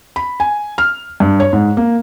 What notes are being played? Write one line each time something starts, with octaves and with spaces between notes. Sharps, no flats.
B5
G#5
F6
G2
C#5
G#2
A#3